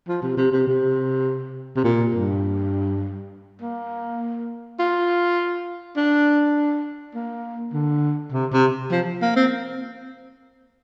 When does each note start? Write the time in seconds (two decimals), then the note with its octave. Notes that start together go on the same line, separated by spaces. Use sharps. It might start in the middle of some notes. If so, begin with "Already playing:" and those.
0.08 F3
0.22 C3
0.37 C3
0.52 C3
0.67 C3
1.76 C3
1.84 A#2
2.15 G2
3.61 A#3
4.79 F4
5.97 D4
7.15 A#3
7.73 D3
8.32 C3
8.53 C3
8.91 F3
9.22 A#3
9.36 C4